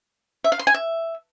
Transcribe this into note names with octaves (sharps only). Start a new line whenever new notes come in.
E5
F5
C6
G#5
E5